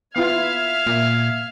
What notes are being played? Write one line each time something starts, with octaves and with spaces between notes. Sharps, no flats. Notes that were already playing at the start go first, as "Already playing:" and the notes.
B3 E4 F4 E5 F5 F6 G#6
A#2